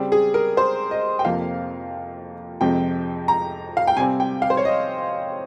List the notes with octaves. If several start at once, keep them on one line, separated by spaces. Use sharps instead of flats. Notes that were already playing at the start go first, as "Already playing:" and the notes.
Already playing: C#3 G3 C4
G#4
A#4
C5
D#5
G5
F2 C3 F3 A#3 F5
F2 C3 F3 G#3 G5
A#5
F5
G5
C3 G3 C4 G#5
G5
F5
C5
C#5
D#5